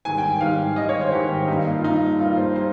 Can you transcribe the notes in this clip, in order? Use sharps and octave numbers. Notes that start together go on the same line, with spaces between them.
G#2 D#3 G3 G#5
G5
G5
G#2 D#3 G3 F5
G#2 D#3 G3 D#5
C#5
C5
G#2 D#3 G3 G4
G2 G3 A#3 D#4
F4
G2 G3 A#3 D#4
G2 G3 A#3 F4
C5
G3 A#3 C5